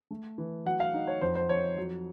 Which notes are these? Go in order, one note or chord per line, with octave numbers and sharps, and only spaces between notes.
A3
E3
F#3 F#5
F5
D#4
C#5
F2 C5
C5
F2 C#5
F#3